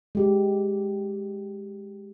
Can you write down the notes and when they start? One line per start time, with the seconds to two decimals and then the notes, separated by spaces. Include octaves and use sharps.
0.15 G#3 G4